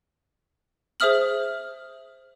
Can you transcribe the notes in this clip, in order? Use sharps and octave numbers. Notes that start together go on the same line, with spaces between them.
G#4 C5 E5 D#6 F6 F#7